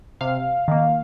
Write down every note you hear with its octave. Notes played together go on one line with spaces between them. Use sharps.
C3 F5
D#3 A#3